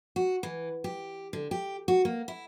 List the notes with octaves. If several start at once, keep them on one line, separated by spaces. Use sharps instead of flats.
F#4
E3
G4
D3
G4
F#4
A#3
E4